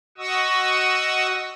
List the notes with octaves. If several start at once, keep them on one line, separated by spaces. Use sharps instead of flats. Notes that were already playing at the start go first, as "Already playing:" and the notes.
F#4 D#5 F#5 C#6 D#6 E6